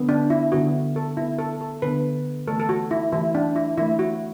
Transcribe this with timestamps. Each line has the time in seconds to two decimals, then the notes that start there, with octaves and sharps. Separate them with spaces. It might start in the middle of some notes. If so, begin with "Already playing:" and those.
Already playing: D3 B3
0.09 D4
0.30 E4
0.52 D3 B3 F#4
0.96 A4
1.17 D3 B3 E4
1.38 A4
1.61 A4
1.82 D3 B3 B4
2.48 E3 A3 A4
2.59 A4
2.69 F#4
2.91 E4
3.12 E3 A3 E4
3.35 D4
3.56 E4
3.77 E3 A3 E4
3.99 F#4